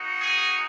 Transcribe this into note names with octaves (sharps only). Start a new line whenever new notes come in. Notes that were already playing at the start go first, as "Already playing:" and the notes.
Already playing: A#3 D#4 F#4
G#4